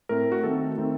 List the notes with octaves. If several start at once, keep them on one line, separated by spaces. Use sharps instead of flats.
A2 A3 C4 A#4
F#4
D#3 A3 C4 A4
D#3 A3 C4